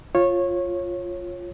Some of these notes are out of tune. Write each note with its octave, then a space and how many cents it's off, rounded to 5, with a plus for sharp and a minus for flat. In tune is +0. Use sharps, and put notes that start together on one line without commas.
F4 +0 C#5 -20